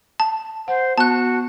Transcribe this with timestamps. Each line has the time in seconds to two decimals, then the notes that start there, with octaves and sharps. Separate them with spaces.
0.20 A5
0.68 C5 F#5
0.97 B3 F#4 A5 F#6